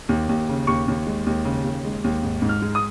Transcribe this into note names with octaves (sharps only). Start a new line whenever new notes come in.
D#2
D#2
C#3
D#2 C#6
D#2
G#3
D#2
C#3
D#2
G#3
D#2
G#2
G#2
F6
G#3
D#6